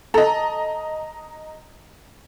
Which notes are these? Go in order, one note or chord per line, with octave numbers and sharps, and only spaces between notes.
A4 D#5 A#5